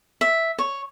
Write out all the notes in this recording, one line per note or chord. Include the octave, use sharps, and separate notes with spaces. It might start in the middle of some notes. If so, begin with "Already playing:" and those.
E5
C#5